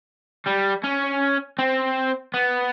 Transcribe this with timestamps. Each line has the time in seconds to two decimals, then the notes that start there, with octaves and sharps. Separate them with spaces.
0.46 G3
0.84 C#4
1.59 C4
2.34 B3